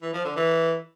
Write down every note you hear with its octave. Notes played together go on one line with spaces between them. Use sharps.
E3
F3
D3
E3